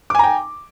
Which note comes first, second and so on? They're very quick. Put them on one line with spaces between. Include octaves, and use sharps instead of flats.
D6 G#5 A#5 G5